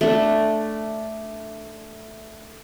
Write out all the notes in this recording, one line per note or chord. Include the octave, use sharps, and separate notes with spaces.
A3 D4